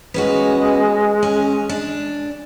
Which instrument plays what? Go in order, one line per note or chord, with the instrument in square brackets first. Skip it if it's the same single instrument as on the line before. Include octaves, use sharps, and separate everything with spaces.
[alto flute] G#3 [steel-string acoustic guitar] B3 C#4 F#4
[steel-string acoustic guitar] C#4
D4